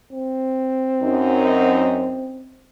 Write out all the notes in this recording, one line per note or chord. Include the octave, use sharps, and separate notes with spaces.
C4
F#2 C#4 D#4